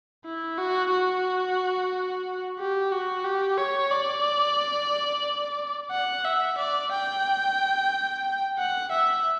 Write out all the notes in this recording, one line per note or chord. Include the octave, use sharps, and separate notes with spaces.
E4
F#4
F#4
G4
F#4
G4
C#5
D5
F#5
E5
D5
G5
F#5
E5